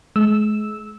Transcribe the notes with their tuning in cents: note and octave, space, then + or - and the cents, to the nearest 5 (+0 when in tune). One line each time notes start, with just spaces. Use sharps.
G#3 +35 E6 -5